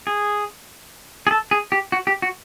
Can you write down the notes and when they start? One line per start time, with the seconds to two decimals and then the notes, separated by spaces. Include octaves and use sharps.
0.07 G#4
1.27 G#4
1.31 A4
1.51 G#4
1.72 G4
1.92 F#4
2.07 G4
2.22 F#4